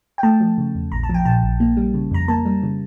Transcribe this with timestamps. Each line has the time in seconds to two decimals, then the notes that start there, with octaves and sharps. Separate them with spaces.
0.18 G5
0.23 A3 A5
0.40 F3
0.58 C#3
0.75 E2
0.92 A#1 A#5
1.03 A5
1.09 F3
1.14 G5
1.25 A#2 A5
1.43 A#1
1.60 A#3
1.77 G3
1.94 C#3
2.11 F2 A#5
2.28 A#3 A5
2.46 G3
2.63 C#3